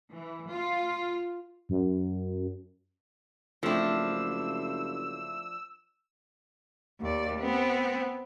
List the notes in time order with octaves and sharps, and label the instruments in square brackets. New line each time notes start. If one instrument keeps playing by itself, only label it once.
[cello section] E3
F4
[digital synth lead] F#2
[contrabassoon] F#1 [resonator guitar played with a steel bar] F3 D4 [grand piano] A3 C4 E4 [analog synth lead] E6
[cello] D#2 D5
B3 C4